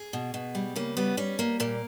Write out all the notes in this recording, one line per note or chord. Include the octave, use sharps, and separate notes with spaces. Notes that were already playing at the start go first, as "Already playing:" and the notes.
Already playing: G#4
B2
B2
G3
C#3 A#3
G3 B3
G3 C#4
G3 A#3
A#2 A#3